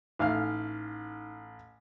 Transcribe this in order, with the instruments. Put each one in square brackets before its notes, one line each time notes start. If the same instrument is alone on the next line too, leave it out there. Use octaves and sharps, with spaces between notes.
[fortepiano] A1 F5 F6 [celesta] D#4